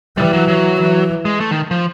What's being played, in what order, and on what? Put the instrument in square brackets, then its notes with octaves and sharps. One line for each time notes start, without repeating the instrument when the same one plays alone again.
[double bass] E3 [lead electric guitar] G3
[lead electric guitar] F#3
F#3
[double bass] E3
[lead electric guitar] G#3
A3
D#3
F3